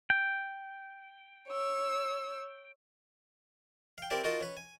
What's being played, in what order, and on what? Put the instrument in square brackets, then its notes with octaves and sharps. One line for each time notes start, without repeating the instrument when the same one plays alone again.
[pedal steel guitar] G5
[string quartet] C#5 E6
[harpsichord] F5 G5
C4 E4 G4 A#4 D5 A5
D#4 F4 F#4 A#4 D#5 A5
C#4 B4
G#5